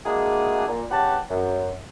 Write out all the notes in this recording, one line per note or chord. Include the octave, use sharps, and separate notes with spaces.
G#3 A#3 D4 E4 F#4 G#4
A#2
E2 C#4 G4 B4 F#5 A5
F#2